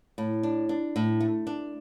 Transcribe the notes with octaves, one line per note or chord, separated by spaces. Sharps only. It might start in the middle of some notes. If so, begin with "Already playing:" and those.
A2
D4
D4
A2
A3
D4